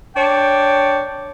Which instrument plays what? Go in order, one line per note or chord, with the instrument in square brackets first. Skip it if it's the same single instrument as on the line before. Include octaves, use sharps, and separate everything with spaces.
[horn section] D4 C#5 G5